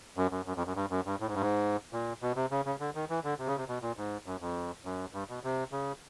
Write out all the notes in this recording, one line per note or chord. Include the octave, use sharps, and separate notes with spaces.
F#2
F#2
F#2
F2
F#2
G2
F#2
G2
A2
G#2
G2
G#2
A#2
B2
C3
C#3
C#3
D3
D#3
E3
D3
C3
C#3
C3
B2
A#2
G#2
F#2
F2
F#2
G2
B2
C3
C#3